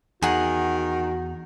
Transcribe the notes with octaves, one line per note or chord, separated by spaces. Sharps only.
E2 D#3 F#4 G#4 F#5